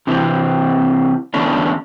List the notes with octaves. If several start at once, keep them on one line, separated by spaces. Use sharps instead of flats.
C3 E3 C4
E2 D3 A3 B3 C#4 D4